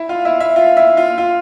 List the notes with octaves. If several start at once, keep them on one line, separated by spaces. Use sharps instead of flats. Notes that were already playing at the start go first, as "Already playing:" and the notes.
Already playing: E4 E5
F4 F5
E4 E5
E4 E5
F4 F5
E4 E5
F4 F5
F4 F5